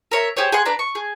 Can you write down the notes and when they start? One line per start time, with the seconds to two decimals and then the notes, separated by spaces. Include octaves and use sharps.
0.11 A#4 C#5 E5
0.37 G4 G#4 C5 C#5
0.52 G#4 F#5 C6
0.65 D4 B4 D5 A#5
0.79 C#6
0.95 G#4